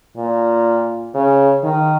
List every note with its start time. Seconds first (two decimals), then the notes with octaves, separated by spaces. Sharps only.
0.17 A#2
1.14 C#3
1.63 D#3